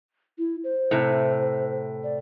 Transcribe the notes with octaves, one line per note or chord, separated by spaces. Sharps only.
E4
C5
A2 C3
D5